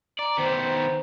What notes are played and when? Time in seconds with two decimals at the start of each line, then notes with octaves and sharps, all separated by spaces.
0.19 D5 A#5
0.38 D#3 B3 C5